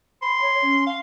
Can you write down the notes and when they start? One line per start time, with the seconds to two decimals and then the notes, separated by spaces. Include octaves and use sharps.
0.22 B5 C6
0.41 C#5
0.62 C#4
0.87 F5